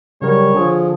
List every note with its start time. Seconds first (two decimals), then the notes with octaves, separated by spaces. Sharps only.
0.22 C#3 F#3 G3 A#4 C#5
0.55 D3 F3 G#4